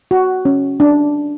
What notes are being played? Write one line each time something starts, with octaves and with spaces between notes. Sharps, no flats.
F#4
C#4
D4